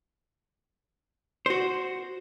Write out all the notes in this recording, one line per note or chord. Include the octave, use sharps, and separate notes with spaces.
F#4 C5